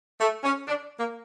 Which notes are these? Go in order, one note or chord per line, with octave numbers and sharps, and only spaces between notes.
A3
C#4
D4
A#3